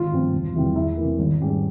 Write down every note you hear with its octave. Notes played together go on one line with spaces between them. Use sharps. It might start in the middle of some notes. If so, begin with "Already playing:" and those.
Already playing: G#1 F4
G2 F3 C4
E1
E2 C3 E3 G3
E2 E4
C3 E3 A#3
G#1
G#2 G3 C#4